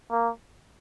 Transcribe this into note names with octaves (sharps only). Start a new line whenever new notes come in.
A#3